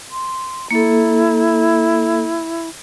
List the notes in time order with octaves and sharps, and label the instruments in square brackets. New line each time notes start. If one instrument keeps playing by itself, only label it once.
[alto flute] C6
[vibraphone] A#3 A4 [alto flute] E4